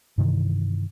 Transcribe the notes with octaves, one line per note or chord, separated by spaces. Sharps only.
G2 C3 D#3 E3